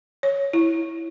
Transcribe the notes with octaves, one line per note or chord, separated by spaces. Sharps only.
C#5
E4